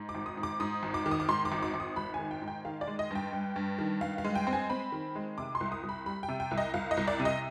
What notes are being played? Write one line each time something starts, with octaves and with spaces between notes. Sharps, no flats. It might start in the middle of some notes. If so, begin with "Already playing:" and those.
Already playing: G#2
D6
G#1
D#6
G#2
D6
G#2 D#6
G#1
D6
D#3
D#6
D6
G#2 C6
D6
G#1
D6
G#1
D#6
G#1 B5
G#5
D#3
G5
G#2
G5
D#3 F5
D5
G#3
D#5
G2 G5
G2
G2
D#3
G2 F5
F5
G#3
G5
C4
G#5
C4 B5
D#3
G#3
C3 D6
C6
C2
D#6
C2
B5
G3 B5
G5
C3
G5
C2
D#5
C2 F5
D#5
C2
D5
C3
D#5